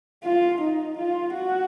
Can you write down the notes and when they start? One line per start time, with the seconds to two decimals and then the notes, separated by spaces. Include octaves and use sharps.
0.24 F4
0.61 D#4
0.97 F4
1.34 F#4